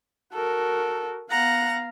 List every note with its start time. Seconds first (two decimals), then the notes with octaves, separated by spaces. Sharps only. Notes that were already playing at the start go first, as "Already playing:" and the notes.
0.33 F#4 A4 A#4
1.31 B3 F5 F#5 A#5